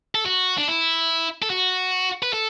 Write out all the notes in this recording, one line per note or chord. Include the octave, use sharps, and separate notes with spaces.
A4
F#4
D4
E4
A4
F#4
B4
A4